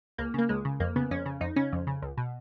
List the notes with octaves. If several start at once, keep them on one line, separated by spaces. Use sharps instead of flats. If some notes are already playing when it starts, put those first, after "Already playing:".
C#2 A#3
C#3 A#3
C#2 G#3
C#3
F2 A#3
C#3 B3
F2 C#4
C#3
F2 D#4
C#3 C#4
F2
C#3
C#2
B2